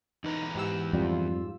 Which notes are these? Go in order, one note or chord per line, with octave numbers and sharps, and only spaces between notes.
E2 D#4 B4 A#5
G#2 G4 E6
F2 G3 F4